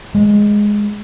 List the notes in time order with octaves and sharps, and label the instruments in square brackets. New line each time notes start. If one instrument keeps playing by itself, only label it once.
[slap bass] G#3